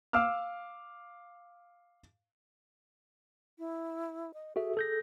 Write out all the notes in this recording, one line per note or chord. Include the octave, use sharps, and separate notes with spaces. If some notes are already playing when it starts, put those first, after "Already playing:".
F5 D6 E6 F6
E4
D#5
F#4 G#4 A4 E5
A4 G6 A#6